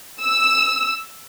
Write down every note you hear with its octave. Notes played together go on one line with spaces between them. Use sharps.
E6